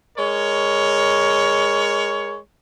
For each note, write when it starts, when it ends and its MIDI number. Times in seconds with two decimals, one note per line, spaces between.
0.18 2.38 56
0.18 2.38 70
0.18 2.38 73